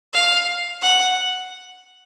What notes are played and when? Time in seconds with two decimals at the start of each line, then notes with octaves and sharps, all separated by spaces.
0.14 F5
0.82 F#5